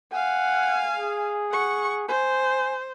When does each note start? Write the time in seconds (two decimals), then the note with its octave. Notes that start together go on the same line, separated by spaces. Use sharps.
0.13 F5 F#5 G#5
0.96 G#4
1.52 F#5 C#6
2.08 C5 G#5